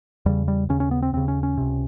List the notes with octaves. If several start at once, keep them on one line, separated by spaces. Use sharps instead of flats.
E2 C#3 G3
G3
D#2 C#3 C#4
C#4
B3
C4
D#2 C#3 C4
C#4
C#4
C#2 C3